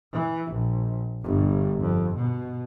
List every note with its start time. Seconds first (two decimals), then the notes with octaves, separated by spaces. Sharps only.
0.13 E3
0.52 A#1
1.23 G1 G2
1.81 F2
2.17 B2